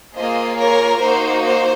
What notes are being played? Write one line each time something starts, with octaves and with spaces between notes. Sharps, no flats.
A#3 F4 G#4 C5 D#5
A#4 C#5
A#3 D#4 F#4 C5
C5